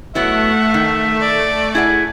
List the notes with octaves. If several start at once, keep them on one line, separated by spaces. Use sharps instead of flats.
F#3 A3 B3 E4 E5 F#5
D#3
D5
E4 G#4 F#5 G#5